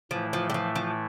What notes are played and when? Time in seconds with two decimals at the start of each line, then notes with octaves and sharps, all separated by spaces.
0.11 A2 E3 F3 A3 E4
0.33 F3
0.50 G3
0.54 F3
0.76 F3